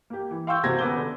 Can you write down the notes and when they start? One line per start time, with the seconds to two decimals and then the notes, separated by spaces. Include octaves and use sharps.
0.10 A#3 G4
0.31 E3
0.47 F5 G5 C6 C#6 E6 G6
0.64 C3 A#3 F#4 C5 G#6 A#6
0.79 D#1 C#3 B3 D6 E6 G7
0.96 D3